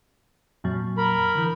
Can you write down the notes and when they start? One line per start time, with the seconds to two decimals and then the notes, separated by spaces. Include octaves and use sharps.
0.64 F2 A#2 F#3
0.98 A#4 B5
1.35 D3 E3